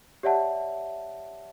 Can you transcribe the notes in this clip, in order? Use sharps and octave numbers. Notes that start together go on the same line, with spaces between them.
G4 C#5 D5 E5 F#5 A5